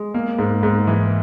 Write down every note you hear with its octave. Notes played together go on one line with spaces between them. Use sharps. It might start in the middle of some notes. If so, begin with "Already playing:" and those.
Already playing: G#3
A#3
G#2
G#2
E3